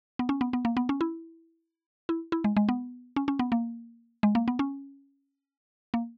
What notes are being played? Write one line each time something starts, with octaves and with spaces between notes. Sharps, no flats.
B3
C#4
B3
B3
A#3
B3
C#4
E4
E4
E4
G#3
G#3
B3
C#4
C#4
B3
A#3
G#3
A#3
B3
C#4
A#3